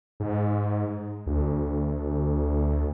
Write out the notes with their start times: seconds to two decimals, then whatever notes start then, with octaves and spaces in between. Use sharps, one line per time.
0.20 G#2
1.27 D2